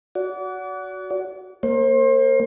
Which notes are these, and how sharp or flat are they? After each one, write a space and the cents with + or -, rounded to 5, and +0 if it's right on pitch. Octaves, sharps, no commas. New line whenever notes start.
F#4 +0 D5 -40
A#3 -10 C5 +35